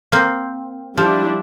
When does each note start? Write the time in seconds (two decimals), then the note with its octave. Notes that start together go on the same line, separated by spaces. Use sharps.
0.12 A#3 C4
0.97 F3 G3 D4 E4